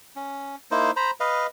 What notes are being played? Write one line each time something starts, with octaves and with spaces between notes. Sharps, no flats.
C#4
A#3 D#4 E4 C5
C5 A#5 B5
B4 D#5 F5